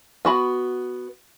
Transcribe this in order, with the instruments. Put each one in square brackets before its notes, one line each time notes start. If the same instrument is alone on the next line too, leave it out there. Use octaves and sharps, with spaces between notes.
[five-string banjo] B3 F#4 B5